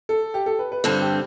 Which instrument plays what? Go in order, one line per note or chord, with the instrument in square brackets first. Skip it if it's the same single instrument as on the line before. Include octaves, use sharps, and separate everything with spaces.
[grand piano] A4
G4
A4
B4
B4
[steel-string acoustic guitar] G2 D3 G3 C4 [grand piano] A4
[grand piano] G4